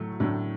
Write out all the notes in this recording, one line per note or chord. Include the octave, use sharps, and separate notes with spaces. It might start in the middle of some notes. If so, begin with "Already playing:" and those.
Already playing: A2 F#3 A3
A2 F#3 A3 D4